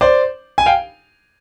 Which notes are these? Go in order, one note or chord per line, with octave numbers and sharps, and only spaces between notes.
C5 D5
G#5
F5 G5